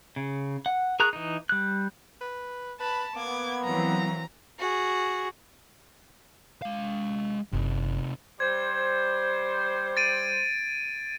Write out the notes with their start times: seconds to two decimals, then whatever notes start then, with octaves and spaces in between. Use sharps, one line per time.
0.16 C#3
0.66 F#5
1.00 G#4 A#4 A#5 C#6 F#6
1.13 E3 D#4
1.49 G3 F#6
2.21 B4
2.80 B4 A5 B5
3.16 A#3 B3 D6 G#6
3.65 E3 F#3 C4 A#5
4.59 F#4 G#4
6.62 G#3 F5
7.52 F#1 C3 D#4 E4
8.40 G3 C5 G#6
9.97 A6 D7 D#7